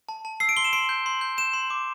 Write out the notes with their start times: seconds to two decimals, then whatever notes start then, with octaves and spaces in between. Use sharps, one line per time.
0.09 A5
0.25 A5
0.40 E6 C7
0.49 D7
0.57 C6 G7
0.64 E7
0.73 C6 D7
0.89 G6
1.06 C6
1.21 G6
1.38 G6 E7
1.54 C6
1.70 D6